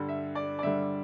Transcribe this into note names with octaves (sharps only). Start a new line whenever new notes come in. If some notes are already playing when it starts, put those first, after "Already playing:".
Already playing: G2 D3 G3
E5
D5
D5
G2 D3 G3 E5